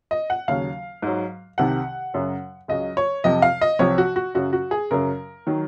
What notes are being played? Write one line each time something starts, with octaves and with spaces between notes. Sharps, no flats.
D#5
F#5
D#2 C#3 F#3 F5
G#2 F#3
C2 C3 D#3 F#5
F#2 C#3 F#3
C#2 C#3 F#3 D#5
C#5
F2 C3 F3 D#5
F5
D#5
C2 C3 F3 C#5
F#4
F#4
F#2 C#3 F#3 F#4
F#4
G#4
F#2 C#3 F#3 A#4
D#3 F#3